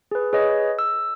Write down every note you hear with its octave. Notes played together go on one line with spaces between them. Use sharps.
G#4 B4
G#4 B4 C#5 D#5
E6